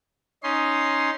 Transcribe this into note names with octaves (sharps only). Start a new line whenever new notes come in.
C#4 D#4 C6